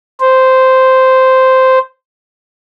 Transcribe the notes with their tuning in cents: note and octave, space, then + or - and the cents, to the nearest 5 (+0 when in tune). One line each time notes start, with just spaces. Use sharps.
C5 -5